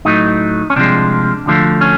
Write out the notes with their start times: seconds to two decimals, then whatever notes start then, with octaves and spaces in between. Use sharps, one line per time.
0.05 A2 F#3 A3 D#4
0.70 C#4
0.76 C2 C3 F3 G#3 D4
1.46 D2 D3 F3 A3
1.81 C#4